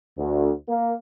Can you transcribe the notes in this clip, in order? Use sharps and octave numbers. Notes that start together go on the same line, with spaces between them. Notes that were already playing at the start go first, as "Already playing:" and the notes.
D2
A#3